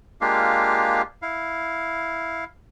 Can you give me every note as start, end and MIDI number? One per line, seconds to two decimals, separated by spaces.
0.21 1.02 56
0.21 1.02 58
0.21 1.02 62
0.21 1.02 65
0.21 1.02 67
0.21 1.02 77
1.22 2.44 64
1.22 2.44 77